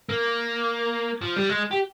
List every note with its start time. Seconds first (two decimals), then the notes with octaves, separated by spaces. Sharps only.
0.09 A#3
1.21 F3
1.36 G3
1.49 G#3
1.71 G4